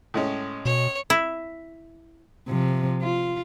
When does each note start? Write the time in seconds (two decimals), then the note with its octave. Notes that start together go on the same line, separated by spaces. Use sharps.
0.14 A2 G#3 C#4
0.65 B2 C#5
1.10 E4
2.48 C3 F3
3.03 F4